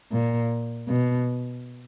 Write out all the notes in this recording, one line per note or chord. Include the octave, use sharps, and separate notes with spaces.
A#2
B2